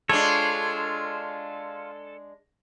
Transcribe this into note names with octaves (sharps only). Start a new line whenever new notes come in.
G#3 D4 F4 A4 C#5